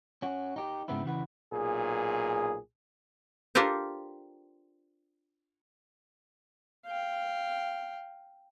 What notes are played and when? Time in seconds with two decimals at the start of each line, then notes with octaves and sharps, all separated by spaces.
0.22 C#4 F#4
0.56 D#4 G4
0.88 G#2 C#3 B3 C4 E4
1.04 C#3 E3 F#4 B4
1.52 B1 A#2 G#4
3.55 D4 F4 G4 A4 A#4 C5
6.86 F5 G5